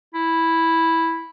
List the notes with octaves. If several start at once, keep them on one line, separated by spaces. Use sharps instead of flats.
E4